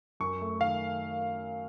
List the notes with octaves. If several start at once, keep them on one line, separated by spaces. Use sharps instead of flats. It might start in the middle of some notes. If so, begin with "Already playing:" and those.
F#2 C#6
A3
D#3 F5